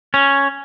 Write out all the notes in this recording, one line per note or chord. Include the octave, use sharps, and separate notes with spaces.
C#4